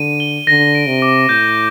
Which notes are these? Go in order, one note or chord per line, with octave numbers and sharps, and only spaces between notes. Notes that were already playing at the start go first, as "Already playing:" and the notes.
Already playing: D3 D#7
G7
D3 A#6
D7
C3
D6
A2 G6